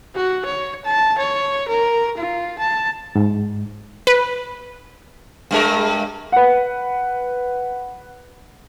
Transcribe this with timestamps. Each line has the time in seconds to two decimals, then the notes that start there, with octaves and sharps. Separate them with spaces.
0.15 F#4
0.46 C#5
0.85 A5
1.18 C#5
1.68 A#4
2.17 F4
2.59 A5
3.15 G#2
4.07 B4
5.51 G2 G#3 A#4
6.32 B4 F#5